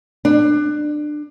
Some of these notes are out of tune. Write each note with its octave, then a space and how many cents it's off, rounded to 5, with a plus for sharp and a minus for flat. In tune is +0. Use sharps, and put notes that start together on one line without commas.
D4 +25